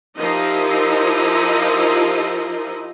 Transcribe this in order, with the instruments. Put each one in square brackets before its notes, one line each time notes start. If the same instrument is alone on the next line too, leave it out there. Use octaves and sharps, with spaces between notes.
[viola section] F3 D#4 E4 G4 A#4 D#5